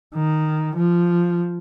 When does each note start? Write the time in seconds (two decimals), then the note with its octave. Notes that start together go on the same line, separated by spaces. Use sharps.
0.15 D#3
0.76 F3